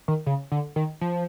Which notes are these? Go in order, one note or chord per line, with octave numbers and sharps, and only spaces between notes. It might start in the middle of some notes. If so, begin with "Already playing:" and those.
D#3
C#3
D3
D#3
F3